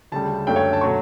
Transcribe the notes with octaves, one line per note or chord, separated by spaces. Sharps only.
D2 C#3 G3 A5
F#2 D3 A3 G5
C#5
A5
B2 F#3 A3 C#6